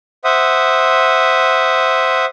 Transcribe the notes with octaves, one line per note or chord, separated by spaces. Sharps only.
C5 E5 F#5 D#6